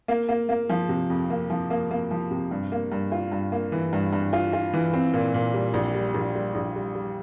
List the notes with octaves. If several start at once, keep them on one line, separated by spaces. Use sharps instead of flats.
A#3
A#3
A#3
F3
C3
F2
A#3
F3
A#3
A#3
F3
C3
G2
A#3
G2
F4
G2
A#3
E3
G2
G2
F4
F4
E3
C4
A#2
A#2
G3
A#1
G3
A#1
G3
A#1
G3
G3